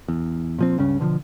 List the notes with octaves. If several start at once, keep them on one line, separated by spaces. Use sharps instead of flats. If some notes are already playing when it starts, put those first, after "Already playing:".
E2
A#2 F3 C4
C#2 G2 C#3 C#4
B2 D3 D#3 F3